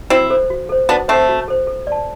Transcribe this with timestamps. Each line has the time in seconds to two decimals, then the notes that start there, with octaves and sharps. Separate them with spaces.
0.10 C4 E4 F#4
0.30 A4 C5
0.50 F#4
0.69 A4 C5
0.89 B3 D4 F#4
1.08 A3 C4 A4 C5
1.29 F#4
1.48 A4 C5
1.67 A4
1.87 D5 A5